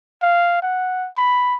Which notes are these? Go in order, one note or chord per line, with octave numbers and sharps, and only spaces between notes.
F5
F#5
B5